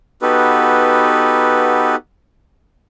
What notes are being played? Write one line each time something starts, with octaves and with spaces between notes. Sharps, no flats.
B3 D#4 F#4 G4 A4 B4